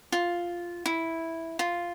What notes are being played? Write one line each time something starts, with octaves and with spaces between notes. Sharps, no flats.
F4
E4
F4